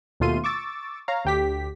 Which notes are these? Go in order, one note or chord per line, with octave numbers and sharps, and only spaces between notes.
D#2 B2 A3 F4 C6 D#7
C#6 D6 E6 A6
C#5 F5 A#5
D2 G4 B6